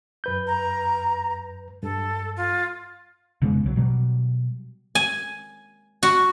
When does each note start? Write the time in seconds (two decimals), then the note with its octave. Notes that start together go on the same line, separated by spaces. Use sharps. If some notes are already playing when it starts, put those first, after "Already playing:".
0.24 F#2 B4 G6
0.47 A#5
1.83 G2 A4
2.36 F4
3.42 F1 C#3 G#3 B3
3.64 B1 F#3
3.76 B2 F#3 G3
4.95 G#5
6.03 F#4